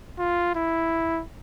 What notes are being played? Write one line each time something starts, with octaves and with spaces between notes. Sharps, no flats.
F4
E4